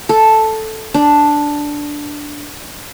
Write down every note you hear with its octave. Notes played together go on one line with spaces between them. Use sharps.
A4
D4